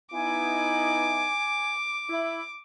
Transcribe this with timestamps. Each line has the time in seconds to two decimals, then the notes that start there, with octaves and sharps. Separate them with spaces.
0.13 B3 D#4 E4 G#5 D6
2.09 E4